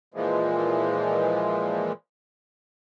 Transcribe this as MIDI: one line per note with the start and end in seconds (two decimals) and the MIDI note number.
0.14 1.92 46
0.14 1.92 52
0.14 1.92 53
0.14 1.92 56